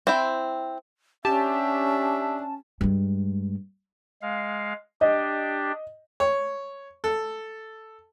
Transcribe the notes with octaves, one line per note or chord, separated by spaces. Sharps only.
C4 E4 G5
C#4 D4 G4 E5 A5
G2 G#3
G#3 F5
D4 G4 D#5
C#5
A4